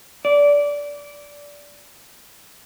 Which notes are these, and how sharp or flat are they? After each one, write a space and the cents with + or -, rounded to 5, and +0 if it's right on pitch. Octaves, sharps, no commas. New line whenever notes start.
D5 -15